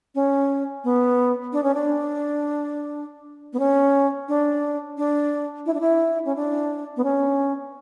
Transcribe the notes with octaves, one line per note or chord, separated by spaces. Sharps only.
C#4
B3
D4
C#4
D4
B3
C#4
D4
D4
E4
D4
E4
C#4
D4
B3
C#4